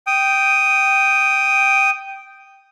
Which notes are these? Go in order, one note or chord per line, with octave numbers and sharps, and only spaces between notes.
G5 D#6